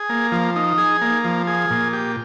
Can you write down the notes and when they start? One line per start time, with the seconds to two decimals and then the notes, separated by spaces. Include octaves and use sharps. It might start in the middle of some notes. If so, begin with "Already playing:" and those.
Already playing: G#4
0.09 A#3
0.32 F3
0.56 D#4
0.78 G#4
1.02 A#3
1.25 F3
1.47 G#4
1.71 A#2
1.93 G4